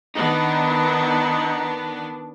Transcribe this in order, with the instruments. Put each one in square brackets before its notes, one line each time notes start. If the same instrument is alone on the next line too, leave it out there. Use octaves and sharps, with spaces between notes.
[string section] D#3 B3 D4 [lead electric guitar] D#4